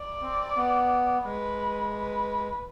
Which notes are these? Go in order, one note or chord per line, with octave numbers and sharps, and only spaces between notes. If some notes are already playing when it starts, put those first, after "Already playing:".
Already playing: D5
C4
B3
G#3 B4
B4